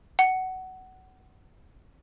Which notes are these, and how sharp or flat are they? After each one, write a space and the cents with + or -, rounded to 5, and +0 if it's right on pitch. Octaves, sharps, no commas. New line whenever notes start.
F#5 +20